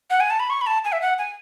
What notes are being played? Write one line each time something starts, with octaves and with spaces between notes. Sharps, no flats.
F#5
G#5
A5
B5
C#6
B5
A5
G#5
E5
F#5
G#5